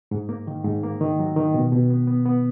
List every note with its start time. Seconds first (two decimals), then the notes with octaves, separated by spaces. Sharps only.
0.11 G#2
0.29 A#3
0.47 D#3
0.64 G#2
0.83 A#3
1.01 D#3
1.19 F#3
1.36 D#3
1.54 B2
1.72 B2
1.90 B3
2.07 B3
2.26 B3